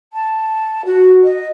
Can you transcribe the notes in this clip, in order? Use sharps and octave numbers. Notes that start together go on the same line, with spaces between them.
A5
F#4
D#5